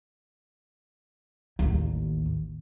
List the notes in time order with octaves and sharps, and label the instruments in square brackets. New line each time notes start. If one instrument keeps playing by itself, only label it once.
[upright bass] A1 D#2